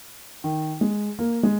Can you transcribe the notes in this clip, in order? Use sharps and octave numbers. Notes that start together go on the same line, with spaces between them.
D#3
G#3
A#3
G#3